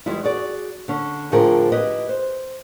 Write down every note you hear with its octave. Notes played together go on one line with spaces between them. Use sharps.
E2 G3 G#3 E4
F#4 G#4 D5
D3 C#4
A2 D3 F3 C4 G#4 A#4
E4 G4 B4 D#5
C5